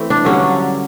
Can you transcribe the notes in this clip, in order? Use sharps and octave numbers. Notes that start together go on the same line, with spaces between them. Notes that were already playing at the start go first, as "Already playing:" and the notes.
Already playing: E3 A3 C4
D4
G2 D3 F#3 C#4